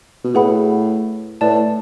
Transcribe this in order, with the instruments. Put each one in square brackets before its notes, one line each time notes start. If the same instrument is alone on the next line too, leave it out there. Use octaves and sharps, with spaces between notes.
[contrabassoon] B2
[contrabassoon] A2 [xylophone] G#4 B4 F#5 B5
[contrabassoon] A2 [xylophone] B4 D5 A5